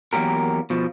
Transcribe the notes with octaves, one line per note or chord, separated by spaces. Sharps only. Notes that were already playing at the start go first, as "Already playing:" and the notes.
E2 F#3 A#3 G4 A#4
B2 F3